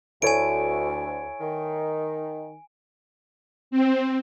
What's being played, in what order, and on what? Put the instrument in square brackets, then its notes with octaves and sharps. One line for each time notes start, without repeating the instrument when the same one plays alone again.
[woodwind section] D2 [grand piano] E4 A4 C#5 [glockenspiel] G#5 D7
[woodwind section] D#3
[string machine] C4